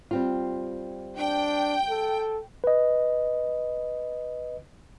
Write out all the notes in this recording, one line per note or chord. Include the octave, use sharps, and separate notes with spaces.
G3 C4 F4
D4 G5
A4
B4 D#5